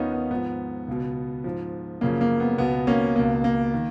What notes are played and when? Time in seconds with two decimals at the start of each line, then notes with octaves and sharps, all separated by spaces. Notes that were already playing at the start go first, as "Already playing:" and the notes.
Already playing: D#2 D#3 B3 C#4 D#4 F4
0.12 B3
0.31 G#2 F3 B3
0.88 C#2 B2
1.44 G#2 F3
2.01 F#2 C#3 F3 A#3
2.21 A#3
2.40 B3
2.58 C#2 B2 B3
2.87 A#3 C#4
3.15 C#2 B2 A#3
3.44 A#3
3.74 D#3